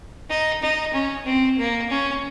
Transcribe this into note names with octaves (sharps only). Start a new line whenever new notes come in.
D#4
D#4
C#4
C4
A#3
C#4